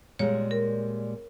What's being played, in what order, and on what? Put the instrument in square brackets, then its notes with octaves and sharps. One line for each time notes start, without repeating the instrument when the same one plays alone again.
[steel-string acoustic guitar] A#2 G3 G#3 [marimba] C#5
[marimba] A#4